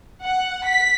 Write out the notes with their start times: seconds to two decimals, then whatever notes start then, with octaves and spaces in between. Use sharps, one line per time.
0.21 F#5
0.65 B6